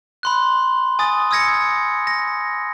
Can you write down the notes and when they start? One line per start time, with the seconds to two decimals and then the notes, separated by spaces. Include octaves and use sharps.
0.23 B5 C6 F#6
0.99 G#5 D#6 A6
1.31 D#6 E6 G#6 A#6 C#7
2.07 A#6